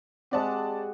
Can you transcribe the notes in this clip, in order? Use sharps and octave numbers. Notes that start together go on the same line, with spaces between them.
G#3 C4 F#4 G4 D5 A5